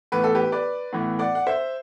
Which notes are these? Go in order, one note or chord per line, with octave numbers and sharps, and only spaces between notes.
A2 E3 B3 B4
A4
G4 B4
B4 D5
A2 E3 B3
D5 F#5
F#5
C5 E5